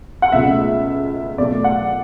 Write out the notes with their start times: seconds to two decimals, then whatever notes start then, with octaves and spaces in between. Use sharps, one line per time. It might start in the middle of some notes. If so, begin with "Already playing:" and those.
0.22 F#5
0.32 C#2 B2 A3 E5
1.38 E2 B2 A3 D5
1.64 F#5